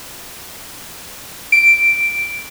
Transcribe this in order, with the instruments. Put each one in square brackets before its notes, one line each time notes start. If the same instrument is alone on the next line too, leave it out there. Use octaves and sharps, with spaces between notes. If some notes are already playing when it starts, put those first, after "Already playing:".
[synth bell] D7